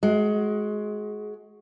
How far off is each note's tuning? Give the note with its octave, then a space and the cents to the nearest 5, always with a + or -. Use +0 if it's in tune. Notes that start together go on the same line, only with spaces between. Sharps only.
G#3 +20 F#4 +0